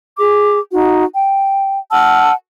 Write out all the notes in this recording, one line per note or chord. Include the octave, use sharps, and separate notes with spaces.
G#4 D6
D#4 F#4
G5
F#5 A5 E6 F6